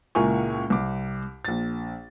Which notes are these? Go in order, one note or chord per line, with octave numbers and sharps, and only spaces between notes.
C#2 A#2 E4 A#4 G#5 C#6
C2 D6
A#1 A6